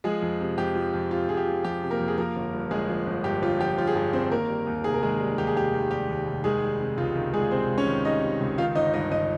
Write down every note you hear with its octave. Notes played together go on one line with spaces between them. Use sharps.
F3 G#3 G#4
F2
C3
F2 G4
F3
F2
C3 F4
F2 G#4
G4
F3
F2 G4
C3
A#3 A#4
F2
G#4
F3 A#3 A#4
G1
G2
G1 G#3 G#4
F3
G1
G2 G4
G1 F4
F3 G4
G1 F4
G#4
G2 G4
G1 C4 C5
D#3 A#3 A#4
G3
D#2
F1 G#4
A#4
D#3 G#3 G#4
G3
D#2 G4
G#4
F1 G4
D#3
G3 G4
D#2
F1
D#3 G#3 G#4
G3
C3
C#2 F4
D#3
G3 G#3 G#4
C3 C4 C5
C#2
C#4 C#5
D#3
G3 D#4 D#5
C3
C#2
D#3 F4 F5
G1 D#4 D#5
G2 D#4 D#5
G1 D#4 D#5